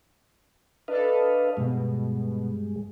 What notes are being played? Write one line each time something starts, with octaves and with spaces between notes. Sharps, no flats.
D4 A4 B4 D#5 F5
G2 B2 G#3